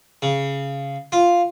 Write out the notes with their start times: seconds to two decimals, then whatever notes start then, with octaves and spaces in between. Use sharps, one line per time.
0.22 C#3
1.12 F4